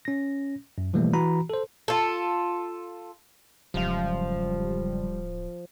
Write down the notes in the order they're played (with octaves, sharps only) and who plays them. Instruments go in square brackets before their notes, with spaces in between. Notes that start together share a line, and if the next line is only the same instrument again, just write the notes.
[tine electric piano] C#4 A#6
F#2
B2 E3 F3 G3 A3 A#3
E3 F#4 A#5 B5
A4 C5
[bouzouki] F4 A4
[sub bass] D1 [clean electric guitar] C#2 F#2 F5 [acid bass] F3 [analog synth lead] G3